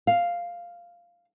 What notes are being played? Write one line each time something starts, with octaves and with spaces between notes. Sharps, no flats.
F5